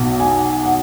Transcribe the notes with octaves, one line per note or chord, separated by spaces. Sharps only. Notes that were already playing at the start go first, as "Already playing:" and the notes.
Already playing: B1 B2
G#5
F#5